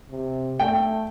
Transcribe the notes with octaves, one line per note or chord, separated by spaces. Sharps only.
C3
A3 G5